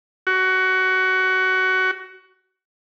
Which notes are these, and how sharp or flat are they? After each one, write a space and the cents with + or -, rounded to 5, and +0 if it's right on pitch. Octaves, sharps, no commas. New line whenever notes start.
F#4 +20